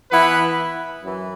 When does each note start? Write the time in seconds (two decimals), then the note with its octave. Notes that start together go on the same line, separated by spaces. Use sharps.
0.11 E3 B3 E4 B4
1.03 F#2 E3